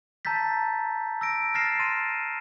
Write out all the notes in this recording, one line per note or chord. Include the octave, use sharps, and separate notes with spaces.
A5 A#5 E6 G6 A6 B6
E6 A#6 D7
F6 A6 A#6 C7 E7
C6 A6 D#7